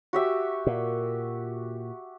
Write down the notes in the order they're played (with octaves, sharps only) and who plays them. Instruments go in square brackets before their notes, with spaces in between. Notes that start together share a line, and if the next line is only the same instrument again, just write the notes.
[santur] F#4 G4 E5
[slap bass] A#2